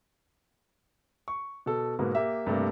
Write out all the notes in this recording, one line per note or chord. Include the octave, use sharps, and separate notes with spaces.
C#6
B2 A4
G#2 B2 A#3 B3
A#3 G4 E5
G2 C3 G3 A3 A#3